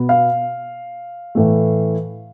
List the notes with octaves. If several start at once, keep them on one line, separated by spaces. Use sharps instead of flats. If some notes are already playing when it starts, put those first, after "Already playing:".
Already playing: B2 B3
F5
A2 E3 A3